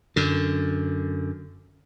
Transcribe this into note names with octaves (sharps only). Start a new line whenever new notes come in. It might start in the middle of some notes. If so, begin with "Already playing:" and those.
F#2 D3